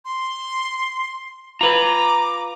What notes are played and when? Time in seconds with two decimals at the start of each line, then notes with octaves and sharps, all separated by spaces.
0.05 C6
1.61 F4 B4 A#5 D6